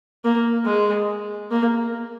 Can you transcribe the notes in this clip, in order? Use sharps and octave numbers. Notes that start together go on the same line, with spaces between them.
A#3
G#3
A#3